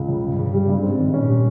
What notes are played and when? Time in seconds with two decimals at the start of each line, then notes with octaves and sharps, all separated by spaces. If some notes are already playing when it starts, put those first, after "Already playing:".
Already playing: C#2
0.08 C#3
0.23 G2 C#3
0.38 C#3
0.54 G3
0.69 G2
0.83 G#2 C4
0.98 D#3
1.13 A#2 C#4
1.29 G3